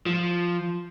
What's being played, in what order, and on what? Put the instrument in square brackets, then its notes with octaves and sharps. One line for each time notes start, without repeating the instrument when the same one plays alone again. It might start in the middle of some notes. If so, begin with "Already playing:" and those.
[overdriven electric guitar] F3